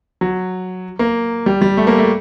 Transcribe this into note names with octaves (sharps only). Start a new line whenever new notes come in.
F#3
A#3
G3
G3
A3
A#3
A3